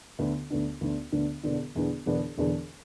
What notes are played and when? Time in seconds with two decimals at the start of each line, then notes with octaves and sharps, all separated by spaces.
0.19 D2 D3 B3 D4
0.50 D2 D3 B3 D4
0.81 D2 D3 B3 D4
1.12 D2 D3 B3 D4
1.43 E1 E2 D3 B3 D4
1.75 E1 E2 D3 B3 D4
2.06 E1 E2 D3 B3 D4
2.38 E1 E2 D3 B3 D4